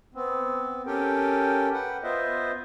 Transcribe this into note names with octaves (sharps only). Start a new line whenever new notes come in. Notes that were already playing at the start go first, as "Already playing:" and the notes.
B3 C4
C#4 G4 A4 A#4 G5
B4 F#5 G5
B3 F4 B4 C5 D#5 E5